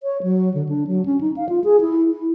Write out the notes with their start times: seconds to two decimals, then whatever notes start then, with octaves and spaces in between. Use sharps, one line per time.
0.03 C#5
0.23 F#3
0.54 D3
0.69 D4
0.87 F#3
1.06 C#4
1.21 D#4
1.37 F5
1.49 F4
1.64 G#4
1.81 E4
2.11 E4